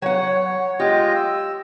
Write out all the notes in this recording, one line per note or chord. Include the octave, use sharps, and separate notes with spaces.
F#3 C#5 F#5
G#3 F4 G4 D#5
E6